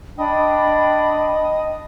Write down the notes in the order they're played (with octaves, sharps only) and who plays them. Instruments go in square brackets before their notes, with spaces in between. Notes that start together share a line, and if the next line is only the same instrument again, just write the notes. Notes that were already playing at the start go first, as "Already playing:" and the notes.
[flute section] D4 G5 B5 [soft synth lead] D#5